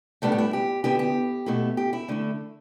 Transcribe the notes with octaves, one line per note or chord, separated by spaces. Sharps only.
A2 G3 A3 B3 D4 A4
G4
E4
G4
D3 B3 E4 G4
G4
B2 A3 E4
G4
E4
D3 A3 E4